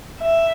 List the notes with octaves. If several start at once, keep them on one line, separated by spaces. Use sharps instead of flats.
E5